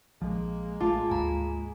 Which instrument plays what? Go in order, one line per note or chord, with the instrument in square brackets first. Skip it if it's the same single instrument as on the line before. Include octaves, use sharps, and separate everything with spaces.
[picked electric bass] A#1 F3 [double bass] G#3 A#3
[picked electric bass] A1 A3 [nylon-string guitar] F4 [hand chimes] A5 D6 A6
[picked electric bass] G#1 D2 [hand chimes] G#5 A#5 B5